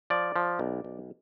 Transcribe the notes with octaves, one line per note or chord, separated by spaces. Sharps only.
F3 D5
F3
B1
B1